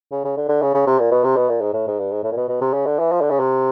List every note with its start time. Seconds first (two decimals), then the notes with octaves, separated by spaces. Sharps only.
0.11 C#3
0.25 C#3
0.37 D3
0.49 D3
0.62 C#3
0.74 C#3
0.87 C3
0.99 A#2
1.12 B2
1.24 C3
1.36 B2
1.49 A#2
1.61 G#2
1.74 A2
1.87 G#2
1.99 G2
2.12 G#2
2.24 A2
2.32 A#2
2.37 B2
2.49 B2
2.61 C3
2.73 C#3
2.86 D3
2.99 E3
3.12 F3
3.21 D3
3.31 C#3
3.40 C3